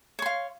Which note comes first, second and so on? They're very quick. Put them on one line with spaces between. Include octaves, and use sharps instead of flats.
C#5 C6 F5